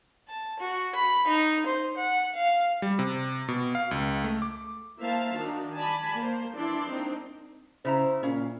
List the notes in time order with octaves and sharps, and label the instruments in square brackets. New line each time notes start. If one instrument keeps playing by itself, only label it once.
[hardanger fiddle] A5
F#4
B5
D#4
C5
F#5
F5
[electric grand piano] G3
C3
B2
F5
C#2
A3
D6
[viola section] A#3 E4 C5 E5 F5 A5
D#3 D4 F#4
D5 G#5 A5 B5
A#3 C5
E3 D4 E4 D5 A5 C6
A#3 C4 D4 D#4
[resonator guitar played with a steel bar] C#3 E4 A#5 [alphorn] C5
[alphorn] A#2 [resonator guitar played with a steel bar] C#4 F5